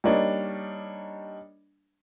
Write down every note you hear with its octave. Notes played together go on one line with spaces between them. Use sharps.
G3 A#3 D4 D#4 C#5